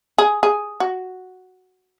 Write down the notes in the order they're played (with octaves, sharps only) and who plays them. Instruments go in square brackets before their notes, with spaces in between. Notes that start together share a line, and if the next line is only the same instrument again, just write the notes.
[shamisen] G#4
G#4
F#4